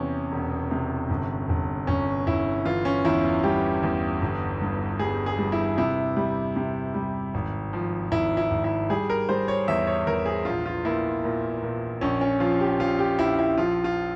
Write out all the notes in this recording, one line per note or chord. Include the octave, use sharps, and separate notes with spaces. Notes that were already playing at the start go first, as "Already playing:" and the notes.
Already playing: E2 C3 C#4
E1
C3
G1
G1
G1 C#4
G1 E4
E3 F4
C#4
E2 E4
F4
G3 G4
E2
G1
G2
G3 G#4
G#4
G3
E4
C3 E4
G3
C3
G3
G#1
F3
G#1 E4
E4
G#1
E4
G3 G#4
A#4
G3 C5
C#5
E2 E5
C#5
E2 A#4
G#4
A#1 F4
F4
A#2 E4
A#2
A#2
A#1 C#4
C#4
F3 F4
G4
F3 F4
G4
A#1 E4
E4
F3 F4
F4